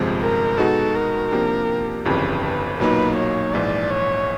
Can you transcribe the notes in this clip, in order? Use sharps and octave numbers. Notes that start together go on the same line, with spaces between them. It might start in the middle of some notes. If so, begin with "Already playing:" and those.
Already playing: G1 F2 C3 F3 G#3
A#4
B2 G#3 B3 D#4 F#4 A4
A#4
C3 F3 A#3 D4 G4
G1 F2 C#3 E3 G3 B4
B4
B1 A#2 F#3 A#3 D#4 B4
C#5
A#1 G#2 E3 D5
C#5